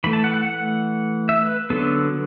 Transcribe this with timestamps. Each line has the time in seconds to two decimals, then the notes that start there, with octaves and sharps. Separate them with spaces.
0.04 E3 A3 B5
0.13 A5
0.24 F#5
0.34 F#5
0.45 F#5
1.29 E5
1.42 B4
1.70 D3 F#3 B3 A4